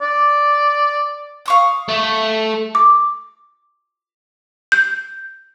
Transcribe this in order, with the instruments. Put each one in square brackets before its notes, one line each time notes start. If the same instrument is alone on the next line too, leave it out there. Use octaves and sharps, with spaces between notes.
[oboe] D5
[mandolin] F5 C#6 D#6
[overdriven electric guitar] A3
[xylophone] D6
G6